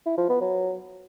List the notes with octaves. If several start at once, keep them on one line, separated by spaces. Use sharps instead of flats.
E4
F3
B3
F#3